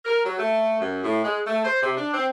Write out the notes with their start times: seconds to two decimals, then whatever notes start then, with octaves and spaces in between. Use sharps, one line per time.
0.05 A#4
0.24 F#3
0.38 A3
0.80 F#2
1.03 A2
1.23 G#3
1.45 A3
1.64 C5
1.81 C3
1.96 D4
2.13 C4